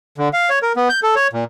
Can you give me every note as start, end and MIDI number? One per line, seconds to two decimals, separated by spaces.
0.18 0.29 50
0.33 0.50 77
0.50 0.59 73
0.63 0.72 70
0.76 0.89 59
0.89 1.00 91
1.03 1.15 69
1.16 1.28 73
1.33 1.44 46